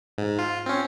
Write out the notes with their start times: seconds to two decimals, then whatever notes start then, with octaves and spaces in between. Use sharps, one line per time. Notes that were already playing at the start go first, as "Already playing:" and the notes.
0.18 G#2
0.39 F4
0.66 C4 C#4